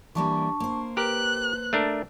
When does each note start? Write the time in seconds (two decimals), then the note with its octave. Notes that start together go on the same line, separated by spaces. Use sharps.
0.15 E3 G3 A#3 D4 A5 C#6
0.60 A#3 C5
0.97 G4 A#4 B4 F#6
1.73 A3 D4 A#4